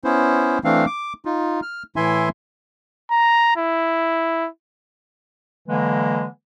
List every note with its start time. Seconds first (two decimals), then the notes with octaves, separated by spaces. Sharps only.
0.04 B3 C#4 E4 C5
0.64 E3 A3 C4 D4 F5
0.86 D6
1.25 D#4 F4
1.62 F6
1.96 A2 E3 E4 E5 G#5 C6
3.11 A#5
3.56 E4
5.67 D3 E3 F#3 G#3 A#3